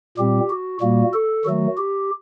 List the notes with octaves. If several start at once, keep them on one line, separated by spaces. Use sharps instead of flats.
A#2 G3 C4 G4
F#4
A#2 G3 A#3 F#4
A4
D#3 F#3 A3 F#4
G4